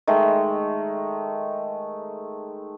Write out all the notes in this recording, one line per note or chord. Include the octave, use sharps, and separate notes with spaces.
D#3 G#3 A3